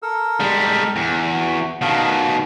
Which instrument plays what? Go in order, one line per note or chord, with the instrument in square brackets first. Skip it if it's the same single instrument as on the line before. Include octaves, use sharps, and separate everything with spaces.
[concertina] A4 A#4 E6
[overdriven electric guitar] G3 G#3
E2
[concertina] F#4
[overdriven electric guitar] B2 D#3 [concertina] F5 A5 D#6
[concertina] A#3